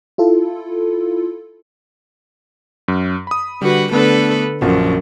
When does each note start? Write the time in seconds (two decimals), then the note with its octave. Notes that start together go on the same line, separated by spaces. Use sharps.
0.18 E4 F4 A4
2.88 F#2
3.27 B5 D#6
3.62 D3 G3 F#4 B4
3.91 D3 A3 B3 D4 A4 B4
4.61 A#1 F#2 F3 F#5